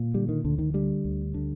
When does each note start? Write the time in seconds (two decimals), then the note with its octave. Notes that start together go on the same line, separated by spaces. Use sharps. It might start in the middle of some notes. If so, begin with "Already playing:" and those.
Already playing: A#2
0.14 D3 G3
0.29 D#3
0.44 D2 D3
0.59 D#3
0.74 D3 G3
1.05 D2
1.34 D3